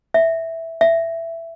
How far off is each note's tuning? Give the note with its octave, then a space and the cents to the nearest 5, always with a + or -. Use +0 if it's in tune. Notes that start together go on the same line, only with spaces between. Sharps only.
E5 -5
E5 +10